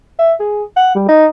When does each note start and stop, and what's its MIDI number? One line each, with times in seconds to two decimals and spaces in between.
0.19 0.33 76
0.40 0.63 68
0.76 0.92 78
0.95 1.06 55
1.09 1.26 63